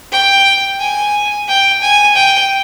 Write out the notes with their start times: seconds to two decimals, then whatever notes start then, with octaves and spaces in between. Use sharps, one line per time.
0.12 G5
0.80 G#5
1.48 G5
1.82 G#5
2.16 G5